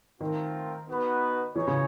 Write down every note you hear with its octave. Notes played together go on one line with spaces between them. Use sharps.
D#3 A3 C4 F4 A#4
B3 D#4 F#4 B4
E3 D#4 G#4 C#5
C#3